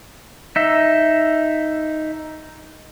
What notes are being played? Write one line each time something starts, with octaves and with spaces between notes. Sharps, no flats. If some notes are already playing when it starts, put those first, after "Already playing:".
D#4 E5